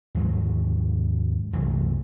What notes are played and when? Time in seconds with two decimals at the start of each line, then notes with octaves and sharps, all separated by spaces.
0.15 D#2 G#2 F3 F#3
1.53 C2 F#2 E3 A3